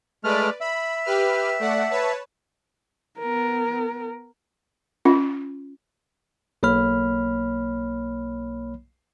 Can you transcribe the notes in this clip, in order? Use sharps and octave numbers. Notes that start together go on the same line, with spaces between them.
G#3 A3 B4 D5 F6
E5 B5
G4 B4 F6
A3 D5 F#5
B4 C#5 A5
B3 A#4
C#4 F4
B1 A#3 C#5 B5 F6